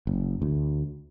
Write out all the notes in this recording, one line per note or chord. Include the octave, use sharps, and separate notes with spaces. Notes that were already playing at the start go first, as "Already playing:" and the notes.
F#1
D2